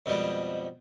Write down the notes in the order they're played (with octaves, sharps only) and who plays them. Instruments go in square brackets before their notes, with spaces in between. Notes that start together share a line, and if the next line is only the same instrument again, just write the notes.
[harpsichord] F2 B2 F3 G3 G#3